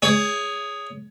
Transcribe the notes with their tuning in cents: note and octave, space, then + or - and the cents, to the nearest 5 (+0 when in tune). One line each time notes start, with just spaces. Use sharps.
G#4 -5 C#5 +20